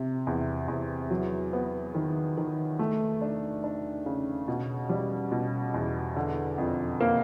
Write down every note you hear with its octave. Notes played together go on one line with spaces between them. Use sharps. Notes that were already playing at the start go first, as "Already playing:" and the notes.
Already playing: C3
E2
E2
F#3
B3
D#3
D#3
A3
D4
D4
C#3
B2
G3
B2
E2
D3
F2
A#3